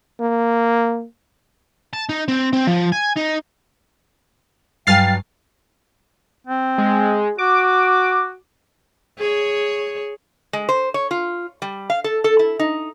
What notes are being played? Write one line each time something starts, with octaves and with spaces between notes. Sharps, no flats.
A#3
A5
D#4
C4
C4
F3
G#5
D#4
G2 F#3 F5 G5 G#5 F6 A6 C7
C4
G#3
F#4 D6
G#4 C#5
G#3
C5
C#5
F4
G3
F5
A4
A4
E4
D#4